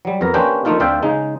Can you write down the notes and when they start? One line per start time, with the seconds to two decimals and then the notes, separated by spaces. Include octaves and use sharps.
0.05 F#3 G3
0.21 F2 B3 A#4 A#5
0.34 A#3 C#4 D4 G4 B4 C5
0.65 D3 F3 A3 A#3 D#4 F4
0.80 D2 C4 D5 E5 F5 G5
1.03 C#3 G#3 D#4